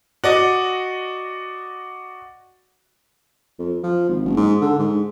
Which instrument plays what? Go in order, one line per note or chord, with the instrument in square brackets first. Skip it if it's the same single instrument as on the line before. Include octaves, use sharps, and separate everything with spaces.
[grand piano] F#4 D5 D#5
[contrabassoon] F2
F3
G#1
F#1
G#2
D3
G#2